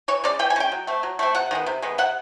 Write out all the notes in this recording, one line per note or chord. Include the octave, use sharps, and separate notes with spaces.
E3 C#5
G#3 C#4 D5
E3 G5
G#5
G#3 C#4 G5
F#3
A3 C4
F#3
A3 C4
C3 F#5
D#3 G#3 B3
C3
D#3 G#3 B3
C3 F#5